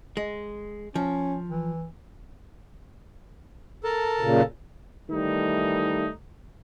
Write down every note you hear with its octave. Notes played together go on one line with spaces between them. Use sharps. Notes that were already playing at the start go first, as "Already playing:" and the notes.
G#3
F3 C#4
E3
A4 A#4 A5
A#2 C#3
D#3 E3 G3 A3 D#4